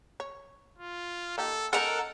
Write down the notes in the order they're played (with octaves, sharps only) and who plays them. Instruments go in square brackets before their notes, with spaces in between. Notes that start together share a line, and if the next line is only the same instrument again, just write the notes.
[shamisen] C#5
[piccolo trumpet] F4
[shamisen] A#3 D#4 G4 [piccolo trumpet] A4
[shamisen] G#3 C#4 D#4 [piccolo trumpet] A4 [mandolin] A#4 F#5